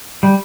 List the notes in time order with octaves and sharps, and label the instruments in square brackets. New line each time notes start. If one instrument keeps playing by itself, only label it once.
[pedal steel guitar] G3